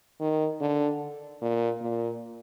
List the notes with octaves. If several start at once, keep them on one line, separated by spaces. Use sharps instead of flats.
D#3
D3
A#2
A#2